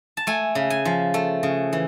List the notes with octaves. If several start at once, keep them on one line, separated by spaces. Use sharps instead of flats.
A5
A3 G#5
C#3
G#5
F3
A3
C#3
E3